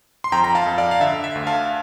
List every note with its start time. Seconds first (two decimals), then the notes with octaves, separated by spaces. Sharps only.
0.24 C6
0.32 F2 G5 A#5
0.44 A#5
0.55 F5 A5
0.67 F2
0.78 D5 F5
0.91 F5
1.01 D3 E5
1.24 E5
1.35 D2
1.47 F5 A5